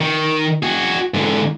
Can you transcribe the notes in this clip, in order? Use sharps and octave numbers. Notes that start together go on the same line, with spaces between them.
D#3
F#4 G#4
G#2 D3